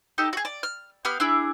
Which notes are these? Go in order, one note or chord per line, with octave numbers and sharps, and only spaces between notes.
D#4 G4 A4
F#4 G#4
D5
F6
B3 G4 F5 F6
D4 E4 G#4